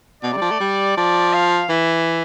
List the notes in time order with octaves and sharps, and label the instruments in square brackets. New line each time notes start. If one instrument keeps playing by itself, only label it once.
[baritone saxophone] B2 [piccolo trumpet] D5
[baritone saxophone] C3
G3
F3
A3
G3
[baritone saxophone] F3 [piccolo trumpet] D5
[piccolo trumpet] F5
[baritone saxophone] E3 [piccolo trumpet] E5